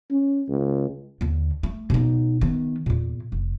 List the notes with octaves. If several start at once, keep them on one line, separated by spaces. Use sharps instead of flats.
C#4
C#2
D#2 D3
A3
B2 D#4
D#3 B3
E2 A#2
F1